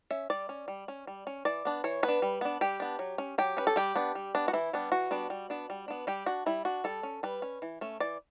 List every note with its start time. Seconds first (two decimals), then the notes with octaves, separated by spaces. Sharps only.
0.11 C#4 E5
0.30 G3 D5
0.49 C#4
0.68 G3
0.88 C#4
1.07 G3
1.27 C#4
1.45 E3 D5
1.65 B3 D4
1.84 E3 C#5
2.03 B3 B4
2.08 D4
2.22 G3
2.41 B3 D4
2.61 G3 G4
2.80 B3 D4
2.99 F#3
3.18 C#4
3.38 F#3 G4
3.57 C#4 B4
3.67 A4
3.76 G3 G4
3.96 B3 D4
4.15 G3
4.35 B3 D4
4.48 F#4
4.53 E3 E4
4.73 G3 B3 D4
4.92 E3 F#4
5.11 G3 B3 D4
5.30 G3
5.50 B3 D4
5.70 G3
5.88 B3 D4
6.07 G3 G4
6.26 D4 F#4
6.46 G3 E4
6.65 D4 F#4
6.84 G3 A4
7.03 C#4
7.23 G3 B4
7.42 C#4
7.62 E3
7.81 A3 C#4
8.00 E3 D5